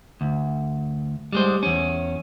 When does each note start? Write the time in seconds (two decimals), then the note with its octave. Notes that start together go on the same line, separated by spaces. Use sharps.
0.21 D2
1.33 G3 G#3 C5
1.63 E2 C#4